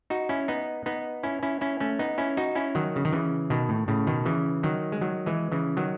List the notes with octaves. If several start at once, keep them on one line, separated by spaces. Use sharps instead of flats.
D#4 F#4
C#4 E4
B3 D#4
B3 D#4
C#4 E4
C#4 E4
C#4 E4
A3 C#4
B3 D#4
C#4 E4
D#4 F#4
C#4 E4
D#3 F#3
C#3
D#3
C#3 E3
B2 D#3
A2
A2 C#3
B2 D#3
C#3 E3
D#3 F#3
G#3
D#3 F#3
E3 G#3
C#3 E3
D#3 F#3